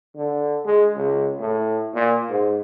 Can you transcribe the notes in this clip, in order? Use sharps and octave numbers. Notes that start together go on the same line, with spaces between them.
D3
G#3
C#2
A2
A#2
G#2